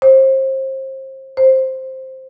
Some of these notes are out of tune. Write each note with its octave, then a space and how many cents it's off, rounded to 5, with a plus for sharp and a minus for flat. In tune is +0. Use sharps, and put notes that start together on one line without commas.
C5 +30
C5 +5